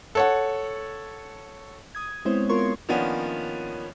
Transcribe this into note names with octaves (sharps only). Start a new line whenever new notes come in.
A4 C#5 F#5
D#6 G#6
G#3 B3 C4 E4 C5 C#5
B3 F4 A#4 C6 C#6 G#6
D#3 F3 A#3 B3 C#4 D4